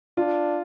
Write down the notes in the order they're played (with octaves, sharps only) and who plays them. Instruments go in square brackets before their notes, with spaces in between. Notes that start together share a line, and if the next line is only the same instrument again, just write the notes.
[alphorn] D4 [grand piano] F4